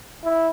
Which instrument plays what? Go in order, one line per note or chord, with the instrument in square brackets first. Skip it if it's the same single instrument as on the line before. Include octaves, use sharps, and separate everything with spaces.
[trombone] E4